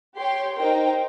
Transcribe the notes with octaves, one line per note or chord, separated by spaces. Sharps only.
G4 C#5 G5 C6
D#4 A#4 C5 G5